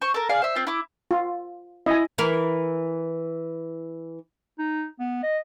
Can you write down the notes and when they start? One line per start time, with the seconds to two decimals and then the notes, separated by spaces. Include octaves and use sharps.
0.01 C5 C#6
0.14 A4 A#4
0.29 G#4 D5 F5
0.42 C5 E5
0.55 C4 F4
0.67 E4 D6
1.11 F4
1.86 E4 D#5 G#5
2.18 E3 A#4
4.59 D#4
4.99 B3
5.23 D#5